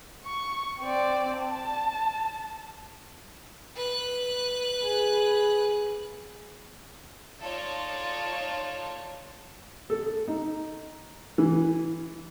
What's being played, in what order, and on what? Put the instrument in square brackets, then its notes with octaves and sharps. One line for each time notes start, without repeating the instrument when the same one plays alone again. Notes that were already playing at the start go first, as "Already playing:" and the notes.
[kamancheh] C#6
C4 D5
A5
[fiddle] B4 F#6
[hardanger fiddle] G#4
[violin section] D#4 F4 A4 C#5 D5
[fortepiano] A4
D#4
E3